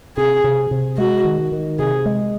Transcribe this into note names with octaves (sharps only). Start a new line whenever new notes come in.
C3 G#4
C3
C3
G#3 F#4
D#3
D#3
C3 G#4
G#3